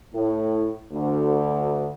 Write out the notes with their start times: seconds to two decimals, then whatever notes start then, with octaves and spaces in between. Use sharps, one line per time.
0.14 A2
0.92 D2